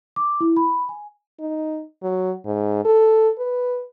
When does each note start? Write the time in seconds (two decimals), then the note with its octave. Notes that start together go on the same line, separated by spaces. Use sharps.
0.16 D6
0.41 E4
0.57 B5
0.89 G#5
1.40 D#4
2.03 F#3
2.45 G#2
2.85 A4
3.38 B4